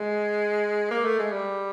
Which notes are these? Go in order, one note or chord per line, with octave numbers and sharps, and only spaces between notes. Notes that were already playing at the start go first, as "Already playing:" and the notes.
Already playing: G#3
A#3
A3
G#3
G3